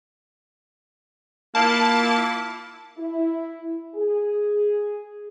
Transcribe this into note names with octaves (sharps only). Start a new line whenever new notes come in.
A#3 E4 F4 A5 D6
E4
G#4